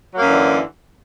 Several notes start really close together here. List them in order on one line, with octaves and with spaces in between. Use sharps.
F#3 A#3 F#2 E3 D3